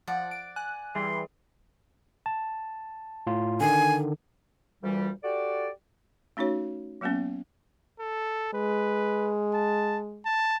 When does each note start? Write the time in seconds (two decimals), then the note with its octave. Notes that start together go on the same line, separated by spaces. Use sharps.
0.08 F3 D5 F#5
0.31 D7
0.56 G#5 F#6
0.95 E3 G3 G#4 C6
2.26 A5
3.27 A2 F4
3.60 D3 D#3 G#5
4.83 D2 A#2 E3 G3
5.24 F#4 G4 A4 D5
6.37 A3 C#4 D#4 F#4 C#5
7.01 F#3 G#3 A#3 B3 C#4
8.00 A4
8.54 G#3 B4
9.54 A5
10.25 A5